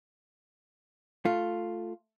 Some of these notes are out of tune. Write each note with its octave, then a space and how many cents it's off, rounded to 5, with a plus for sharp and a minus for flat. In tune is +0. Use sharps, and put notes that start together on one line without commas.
A3 +0 F4 +0